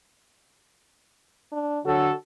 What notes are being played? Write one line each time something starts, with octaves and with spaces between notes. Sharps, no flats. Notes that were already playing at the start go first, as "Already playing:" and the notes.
D4
D3 F#3 F#4 A4